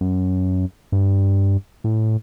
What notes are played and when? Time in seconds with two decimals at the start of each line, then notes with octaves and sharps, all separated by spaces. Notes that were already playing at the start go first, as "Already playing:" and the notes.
0.01 F#2
0.92 G2
1.84 A2